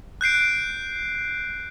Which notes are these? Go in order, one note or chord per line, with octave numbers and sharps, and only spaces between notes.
F#6 G6 C7 D7